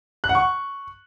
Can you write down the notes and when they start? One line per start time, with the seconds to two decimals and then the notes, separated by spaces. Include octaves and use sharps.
0.24 F#6
0.29 F#5
0.35 C#6